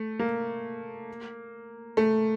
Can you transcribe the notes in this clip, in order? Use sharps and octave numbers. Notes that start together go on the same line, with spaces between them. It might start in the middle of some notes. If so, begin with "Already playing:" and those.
Already playing: A3
A#3
A3